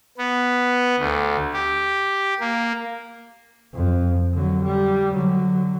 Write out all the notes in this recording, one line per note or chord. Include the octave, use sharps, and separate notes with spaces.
B3
D2
G4
A#3
F2
D3 F#3
G3
D3 F#3